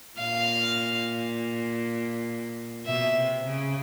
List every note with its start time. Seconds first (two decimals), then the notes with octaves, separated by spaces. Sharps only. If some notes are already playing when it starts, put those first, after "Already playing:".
0.19 A#2 F5
2.86 B2 E5
3.15 C3
3.45 C#3